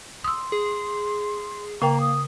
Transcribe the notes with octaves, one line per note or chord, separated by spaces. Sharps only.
C6 D#6 E6
G#4
C#3 A#3 A#4 G5 A#5
D#6